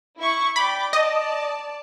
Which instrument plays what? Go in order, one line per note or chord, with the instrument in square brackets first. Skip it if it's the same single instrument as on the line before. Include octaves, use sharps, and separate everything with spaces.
[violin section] E4 C#6
[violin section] D5 G5 D6 [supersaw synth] B5
[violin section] D5 A5 [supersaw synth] D#5